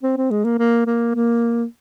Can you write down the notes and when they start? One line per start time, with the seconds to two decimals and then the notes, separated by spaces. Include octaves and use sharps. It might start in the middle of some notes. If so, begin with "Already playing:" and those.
0.03 C4
0.17 C4
0.30 G#3
0.45 A#3
0.59 A#3
0.86 A#3
1.14 A#3